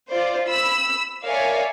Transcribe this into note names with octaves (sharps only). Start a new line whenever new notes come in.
F4 C5 D5
B5 E6
A#4 C#5 D5 E5 F5 G#5